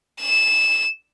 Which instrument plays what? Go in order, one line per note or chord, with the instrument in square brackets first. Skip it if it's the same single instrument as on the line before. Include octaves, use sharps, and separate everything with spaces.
[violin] E7